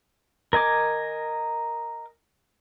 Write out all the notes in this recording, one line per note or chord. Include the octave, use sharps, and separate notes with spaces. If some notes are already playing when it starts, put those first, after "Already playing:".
A#4 D#5 G#5 D6